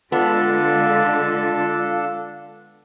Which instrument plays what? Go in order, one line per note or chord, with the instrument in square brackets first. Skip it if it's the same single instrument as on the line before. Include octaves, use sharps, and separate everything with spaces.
[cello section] D3 G#3 [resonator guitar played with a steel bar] B3 [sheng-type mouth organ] D4 A4 A5 [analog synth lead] F4